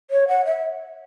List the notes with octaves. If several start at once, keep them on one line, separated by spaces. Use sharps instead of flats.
C#5
F#5
E5